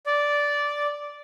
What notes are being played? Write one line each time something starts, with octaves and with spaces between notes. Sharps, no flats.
D5